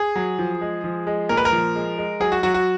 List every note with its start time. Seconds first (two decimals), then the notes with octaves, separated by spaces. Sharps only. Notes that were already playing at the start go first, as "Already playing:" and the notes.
Already playing: G#4
0.16 F#3
0.38 F3
0.61 G#3
0.84 F3
1.07 G#3
1.29 A#2 A#4
1.37 B4
1.45 A#4
1.52 F3
1.75 G#3
1.98 G#3
2.20 F#3 G#4
2.32 F#4
2.43 F#3 F#4
2.54 F#4